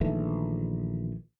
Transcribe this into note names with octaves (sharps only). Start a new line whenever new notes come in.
A#1 D#3 E3 A3